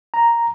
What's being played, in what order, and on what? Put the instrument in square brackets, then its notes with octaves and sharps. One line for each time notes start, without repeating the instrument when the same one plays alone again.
[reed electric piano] A#5